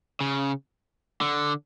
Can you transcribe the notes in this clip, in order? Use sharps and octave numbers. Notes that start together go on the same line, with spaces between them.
C#3
D3